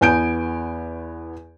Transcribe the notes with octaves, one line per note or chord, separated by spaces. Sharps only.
E2 B3 G#5 G6 D7